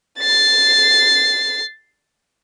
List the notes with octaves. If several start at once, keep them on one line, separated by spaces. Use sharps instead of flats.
A6 C7